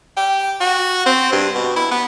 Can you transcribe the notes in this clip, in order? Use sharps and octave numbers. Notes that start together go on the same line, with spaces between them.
G4
F#4
C4
G2
B2
E4
B3